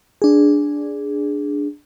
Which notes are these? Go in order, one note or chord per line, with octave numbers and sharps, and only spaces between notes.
D4 G#4